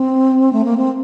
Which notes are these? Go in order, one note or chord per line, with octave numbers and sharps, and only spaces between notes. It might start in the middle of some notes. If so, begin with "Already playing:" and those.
Already playing: C4
A3
A#3
C4